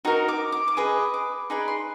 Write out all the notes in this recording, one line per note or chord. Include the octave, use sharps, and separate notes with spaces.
D#4 F#4 A#4
D6
D6
D6
G#4 B4 D#5 D#6
D6
D#4 G#4 B4 D5 B5
C6